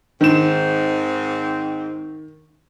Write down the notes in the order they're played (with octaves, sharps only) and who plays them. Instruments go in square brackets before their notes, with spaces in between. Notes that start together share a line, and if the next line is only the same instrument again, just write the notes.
[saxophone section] G#2 C4 [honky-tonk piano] D#3 E7